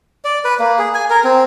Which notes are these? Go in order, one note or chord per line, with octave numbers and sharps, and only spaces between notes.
D5
B4
A#3
G#4
G#5
A#4
C4